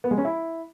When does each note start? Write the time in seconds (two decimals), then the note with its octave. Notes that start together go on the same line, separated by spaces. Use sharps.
0.04 B3
0.11 G#3
0.18 C#4
0.25 E4